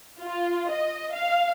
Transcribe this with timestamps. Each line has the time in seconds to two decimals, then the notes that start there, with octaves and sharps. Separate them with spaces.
0.21 F4
0.70 D#5
1.13 F5